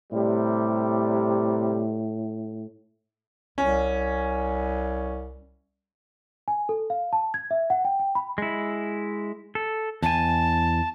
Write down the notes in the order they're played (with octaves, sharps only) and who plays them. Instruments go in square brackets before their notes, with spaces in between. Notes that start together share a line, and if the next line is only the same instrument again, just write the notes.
[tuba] A2 [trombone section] C3 G3
[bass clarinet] C2 [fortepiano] C#4
[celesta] G#5
A4
F5
A5
G#6
E5
F#5
G5
G5
B5
[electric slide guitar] G#3 E4
A4
[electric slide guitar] E2 G#5 [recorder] A5